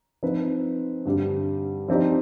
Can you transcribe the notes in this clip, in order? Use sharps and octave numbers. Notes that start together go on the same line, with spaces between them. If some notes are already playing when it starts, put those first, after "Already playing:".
F3 C4 D#4 B4
G2 D3 G3
F3 C4 D#4 G4 D5